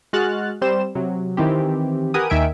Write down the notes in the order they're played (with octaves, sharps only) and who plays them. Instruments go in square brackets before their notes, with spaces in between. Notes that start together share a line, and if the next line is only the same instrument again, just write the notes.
[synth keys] G#3 F#4 F6 F#6 A6
G3 C4 C5 E7
C3 F#3
D#3 E3 C4 G4
G4 A#4 B4 F#5 G#5 D#6
D#2 D#3 E5 G#5 D7